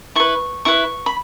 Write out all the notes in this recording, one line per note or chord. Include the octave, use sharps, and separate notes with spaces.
E4 B4 C#6
E4 B4 C#6
B5